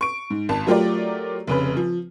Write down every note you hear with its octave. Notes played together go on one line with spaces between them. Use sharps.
C#6 D7
G#2
G#1 A5
F#3 A3 F4 G4 A#4 D5
F1 C#3 B4
F3